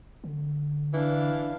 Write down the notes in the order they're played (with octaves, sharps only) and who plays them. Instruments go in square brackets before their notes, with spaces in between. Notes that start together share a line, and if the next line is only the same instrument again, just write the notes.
[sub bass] D3
[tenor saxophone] E3 [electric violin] D4 F5